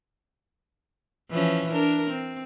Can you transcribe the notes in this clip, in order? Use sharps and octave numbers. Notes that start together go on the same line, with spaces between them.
E3 F3 C#4
D4 A#4
C4